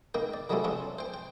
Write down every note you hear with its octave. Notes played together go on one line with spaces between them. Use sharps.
D#3 A#3 G5
D5
D#3 F#3 G3 A3 C4 C#4
F3 C#4 D4 F4
C5 G5
G5